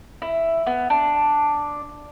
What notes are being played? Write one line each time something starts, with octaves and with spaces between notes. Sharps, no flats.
E4
B3
D4